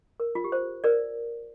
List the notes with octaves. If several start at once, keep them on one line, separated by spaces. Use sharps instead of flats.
A#4
F4
G4
C5
A#4 D5